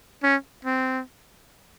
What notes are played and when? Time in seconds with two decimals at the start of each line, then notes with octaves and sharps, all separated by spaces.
0.23 C#4
0.65 C4